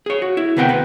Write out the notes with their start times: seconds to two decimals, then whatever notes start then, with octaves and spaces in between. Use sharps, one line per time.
0.06 G#4 C#5
0.22 F#4
0.37 E4
0.57 D2 C3 B3 A#4 F#5 G5
0.69 D2 B4